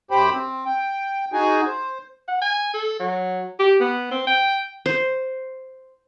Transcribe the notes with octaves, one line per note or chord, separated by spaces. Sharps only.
F#2 G4 C5 G5 B5
C4
G5
D#4 F#4 G#4 G#5
C5
F#5
G#5
A4
F#3
G4
B3
C4
G5
C5